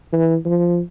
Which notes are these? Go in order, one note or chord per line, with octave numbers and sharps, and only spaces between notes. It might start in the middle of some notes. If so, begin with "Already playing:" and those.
E3
F3